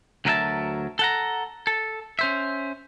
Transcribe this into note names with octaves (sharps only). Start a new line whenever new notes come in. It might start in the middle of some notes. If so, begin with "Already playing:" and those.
D2 F#3 A#4 B4 E5 A5
A4 F#5 A#5
A4
C#4 C5 E5